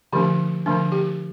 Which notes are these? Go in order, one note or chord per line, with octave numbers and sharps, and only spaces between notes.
D3 F3 A3 D4 G4
D3 F3 A3 D4
G4